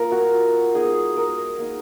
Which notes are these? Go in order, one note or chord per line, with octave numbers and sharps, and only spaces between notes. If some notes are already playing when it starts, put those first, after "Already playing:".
Already playing: A#3 D#4 F4 A#4
F#4
G#3 B3 D#4 G#4
A#4
A#3 D#4